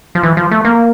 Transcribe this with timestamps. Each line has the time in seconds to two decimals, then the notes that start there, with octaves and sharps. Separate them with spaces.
0.15 F3
0.23 E3
0.37 F3
0.51 A3
0.65 A#3